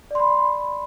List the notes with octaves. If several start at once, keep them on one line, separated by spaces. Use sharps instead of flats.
D5 B5 C6